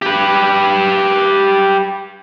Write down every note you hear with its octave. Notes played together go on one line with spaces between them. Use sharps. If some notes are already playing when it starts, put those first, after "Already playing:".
G4 B4